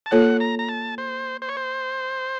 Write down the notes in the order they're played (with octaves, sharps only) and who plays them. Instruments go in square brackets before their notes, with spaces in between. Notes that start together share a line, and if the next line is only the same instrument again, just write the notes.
[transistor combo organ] A5
[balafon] A#3 F4 A4 C#5 [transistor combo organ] F#5
[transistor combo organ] A#5
A#5
A5
C5
C5
C#5
C5